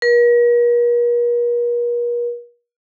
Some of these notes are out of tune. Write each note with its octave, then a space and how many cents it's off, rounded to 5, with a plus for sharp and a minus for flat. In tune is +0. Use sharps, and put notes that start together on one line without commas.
A#4 +45